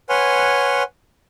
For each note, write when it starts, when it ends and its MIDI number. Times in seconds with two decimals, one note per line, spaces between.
0.09 0.83 71
0.09 0.83 73
0.09 0.83 78
0.09 0.83 80
0.09 0.83 84
0.09 0.83 89